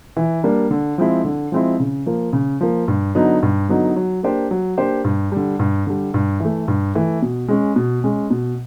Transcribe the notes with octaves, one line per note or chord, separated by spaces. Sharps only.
E3
G3 A#3 D4
D3
F3 G#3 C4 E4
D3
F3 G#3 C4 E4
C#3
F3 A#3
C#3
F3 A#3
G2
D3 F#3 B3 D#4
G2
D3 F#3 B3 D#4
F#3
A#3 D4 G4 C5
F#3
A#3 D4 G4 C5
G2
D3 G3
G2
D3 G3
G2
E3 A3
G2
E3 A3
B2
G#3 C#4
B2
G#3 C#4
B2